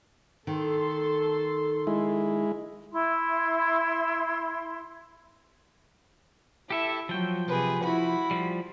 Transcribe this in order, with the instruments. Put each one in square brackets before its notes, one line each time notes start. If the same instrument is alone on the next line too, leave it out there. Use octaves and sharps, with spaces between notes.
[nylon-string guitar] D#3 [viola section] A4 C6
[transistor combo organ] G#3 E4
[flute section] E4 C6
[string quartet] E4 [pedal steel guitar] G4 A4 E5
[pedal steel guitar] F3 G5 [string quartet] F#3
[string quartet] C3 G#4 B4
E4 F#4 B5
[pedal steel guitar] F3 G3